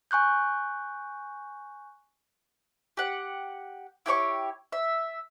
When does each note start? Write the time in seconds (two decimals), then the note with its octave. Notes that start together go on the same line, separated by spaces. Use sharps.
0.11 G#5 C#6 F#6 G6
2.97 G4 F#5
4.06 E4 G4 C#5 C#6
4.72 E5